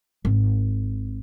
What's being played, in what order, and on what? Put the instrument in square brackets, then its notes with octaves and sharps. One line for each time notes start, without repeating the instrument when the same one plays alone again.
[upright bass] G#1